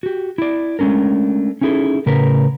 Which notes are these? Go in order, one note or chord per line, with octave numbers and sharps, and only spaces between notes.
F#4 G4
E4 D5
G#3 A3 C#4 D4 A#4
C#4 D#4 E4 G#4 A4
A2 C#3 C#4 A#4 B4